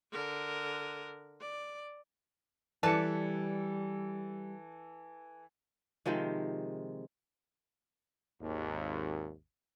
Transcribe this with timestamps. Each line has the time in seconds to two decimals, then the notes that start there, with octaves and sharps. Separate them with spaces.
0.12 D3 A#4
1.41 D5
2.83 E3 G3 A4 B4 D5 A5 C#7
6.06 C3 D#3 F3 G#3
8.40 G#1 D#2